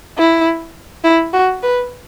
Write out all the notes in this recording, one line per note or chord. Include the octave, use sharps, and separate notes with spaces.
E4
E4
F#4
B4